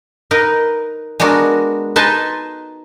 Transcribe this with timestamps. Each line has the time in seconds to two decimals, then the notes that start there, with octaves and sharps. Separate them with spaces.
0.31 D#4 A#4 B4
1.20 G#3 B3 D4 F#4 A#4
1.96 D#4 B4 G#5 A5 C6